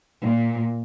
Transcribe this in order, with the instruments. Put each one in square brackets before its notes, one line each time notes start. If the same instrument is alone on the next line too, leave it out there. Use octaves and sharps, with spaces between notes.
[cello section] A#2